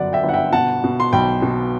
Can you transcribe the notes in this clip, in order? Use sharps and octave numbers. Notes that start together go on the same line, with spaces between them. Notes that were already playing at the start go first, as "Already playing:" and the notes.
Already playing: G1 F#2 D3 D5 F#5
E5 G5
G1
F#5
E5 G5
B2 F#5 A5
B2
C6
B1 G5 B5
B2